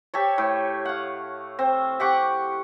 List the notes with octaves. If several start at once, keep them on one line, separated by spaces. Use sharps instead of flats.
G4 A4 C#5
A2
F5 F#5
C4
G4 F#5 C#6 D6